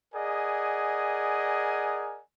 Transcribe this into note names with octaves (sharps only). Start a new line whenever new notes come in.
G#4 A#4 D5 D#5 F#5 G#5